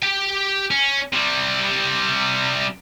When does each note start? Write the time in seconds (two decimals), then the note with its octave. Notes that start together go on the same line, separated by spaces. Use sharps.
0.02 G4 G5
0.71 C#4
1.13 C3 G3